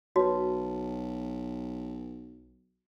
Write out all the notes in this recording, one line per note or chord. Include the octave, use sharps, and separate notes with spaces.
B1 F#4 B4 C#5 A5